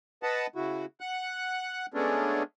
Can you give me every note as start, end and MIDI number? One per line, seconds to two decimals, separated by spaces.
0.23 0.47 71
0.23 0.47 75
0.23 0.47 78
0.23 0.47 81
0.56 0.85 49
0.56 0.85 64
0.56 0.85 66
1.01 1.86 78
1.01 1.86 90
1.94 2.43 56
1.94 2.43 57
1.94 2.43 59
1.94 2.43 61
1.94 2.43 62